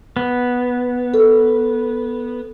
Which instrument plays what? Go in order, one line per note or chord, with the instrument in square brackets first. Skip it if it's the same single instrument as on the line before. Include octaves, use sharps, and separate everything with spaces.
[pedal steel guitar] B3
[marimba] A4